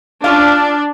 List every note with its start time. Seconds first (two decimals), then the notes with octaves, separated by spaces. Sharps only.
0.24 C#4 D4 F4 F5